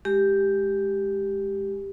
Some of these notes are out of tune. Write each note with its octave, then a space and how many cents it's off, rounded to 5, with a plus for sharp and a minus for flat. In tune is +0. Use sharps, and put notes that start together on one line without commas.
G#3 +0 G4 +0